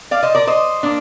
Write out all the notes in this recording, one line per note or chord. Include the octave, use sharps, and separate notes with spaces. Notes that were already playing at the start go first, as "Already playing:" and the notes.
D5 F5
C5 D#5
A#4 D5
C5 D#5
A#3 D4